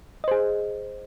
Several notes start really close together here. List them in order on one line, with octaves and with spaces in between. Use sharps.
D#5 C5 G#4